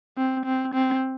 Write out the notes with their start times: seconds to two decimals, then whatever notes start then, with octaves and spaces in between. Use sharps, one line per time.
0.17 C4
0.45 C4
0.74 C4